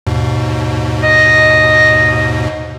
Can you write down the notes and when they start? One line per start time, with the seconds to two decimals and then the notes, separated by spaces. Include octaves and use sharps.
0.07 D#2 G#2 B2
1.03 D#5